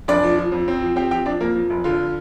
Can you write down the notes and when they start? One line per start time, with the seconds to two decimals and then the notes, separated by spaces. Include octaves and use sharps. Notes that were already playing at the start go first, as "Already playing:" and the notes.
0.08 F1 D4 D5
0.23 F3
0.38 F3
0.52 F2
0.68 C4
0.82 F3
0.96 C4 G4 G5
1.11 F3 G4 G5
1.26 F3 D4 D5
1.40 F2 A#3 A#4
1.55 F3
1.70 F1
1.84 D3 F4